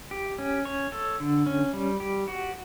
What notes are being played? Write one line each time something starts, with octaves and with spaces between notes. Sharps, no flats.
G4
C#4
C#5
A4
D3
C#4
G3
G4
F#4